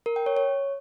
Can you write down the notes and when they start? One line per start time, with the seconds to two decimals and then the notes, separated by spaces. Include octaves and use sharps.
0.06 A#4
0.16 G5
0.26 C#5
0.37 C#5